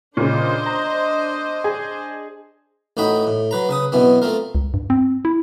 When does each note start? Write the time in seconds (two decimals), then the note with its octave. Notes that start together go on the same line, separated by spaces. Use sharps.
0.17 A#2 C#3 D4 C5 D#5
0.66 A#5
1.64 G#4
2.97 A1 A2 D#4 F#4 G5 B5
3.27 A2
3.51 F#3 B4 A#5
3.69 C#3 B4 D#6
3.92 F#2 B2 E3 B3 C4
4.22 A3 C4 F4 A#4
4.55 C#2
4.74 G2
4.90 C4
5.25 E4